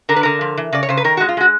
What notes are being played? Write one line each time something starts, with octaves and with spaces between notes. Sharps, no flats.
D3 A#4
B4
D3 A#4
F3
E3
C#3 D5
C#5
C#3 C5
B4
D#3 A#4
G#3 F#4
F4
G#3 F#4